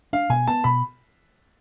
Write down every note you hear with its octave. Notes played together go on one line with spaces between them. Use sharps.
D4 F5
B2 G#5
B3 A5
B2 B5